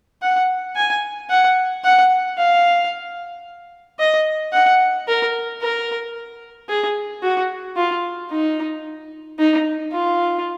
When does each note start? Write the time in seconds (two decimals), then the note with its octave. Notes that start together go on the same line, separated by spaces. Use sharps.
0.22 F#5
0.76 G#5
1.30 F#5
1.84 F#5
2.38 F5
4.00 D#5
4.53 F#5
5.08 A#4
5.62 A#4
6.69 G#4
7.23 F#4
7.77 F4
8.30 D#4
9.39 D#4
9.92 F4